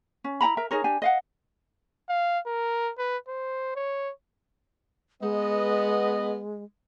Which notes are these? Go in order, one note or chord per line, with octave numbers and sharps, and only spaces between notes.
C#4
E4 G5 A#5 B5
A#4 E5 A#5
D#4 G#4 A#4 C#5
D4 G4 G#5
D#5 F5 F#5
F5
A#4
B4
C5
C#5
G#3 B3 D#5